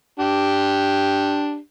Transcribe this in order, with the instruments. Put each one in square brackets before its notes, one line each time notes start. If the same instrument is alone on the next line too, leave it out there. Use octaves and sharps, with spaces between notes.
[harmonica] D4 G4